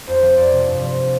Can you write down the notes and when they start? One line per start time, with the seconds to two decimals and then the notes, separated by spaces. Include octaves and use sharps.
0.07 F2 C5
0.22 F3
0.37 F2 D5
0.52 C3
0.67 G2
0.83 F3